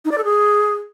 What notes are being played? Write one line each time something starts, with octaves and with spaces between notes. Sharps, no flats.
D#4
D5
A4
G#4